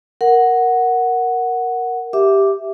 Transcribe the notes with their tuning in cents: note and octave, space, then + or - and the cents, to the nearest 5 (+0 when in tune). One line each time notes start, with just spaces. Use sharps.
A#4 +0 F#5 +0
G4 +0 E5 +0 D6 +0